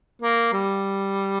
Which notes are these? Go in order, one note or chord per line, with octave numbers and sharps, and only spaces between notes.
A#3
G3